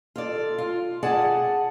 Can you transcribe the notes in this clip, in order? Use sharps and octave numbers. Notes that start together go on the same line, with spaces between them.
F4 A4 D5
F4
G#4 D5 F#5 G#5 A5